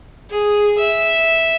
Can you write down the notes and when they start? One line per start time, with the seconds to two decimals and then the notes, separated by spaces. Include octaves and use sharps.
0.30 G#4
0.78 E5